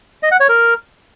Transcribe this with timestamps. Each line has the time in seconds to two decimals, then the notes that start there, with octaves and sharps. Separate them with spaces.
0.23 D#5
0.31 F#5
0.40 C#5
0.49 A#4